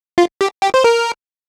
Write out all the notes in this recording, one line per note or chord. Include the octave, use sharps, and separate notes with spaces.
F4
G4
G4
C5
A#4